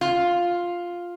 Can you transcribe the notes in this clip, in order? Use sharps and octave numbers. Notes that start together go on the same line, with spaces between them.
F4